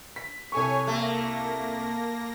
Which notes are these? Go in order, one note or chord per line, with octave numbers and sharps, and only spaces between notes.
B6
C2 A4 C#5 G#5 C#6
A3 A#3 A#6